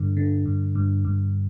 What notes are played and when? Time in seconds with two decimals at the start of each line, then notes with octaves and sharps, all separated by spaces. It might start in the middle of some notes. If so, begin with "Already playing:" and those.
Already playing: G2 D3
0.17 D3
0.46 G2
0.75 G2
1.05 G2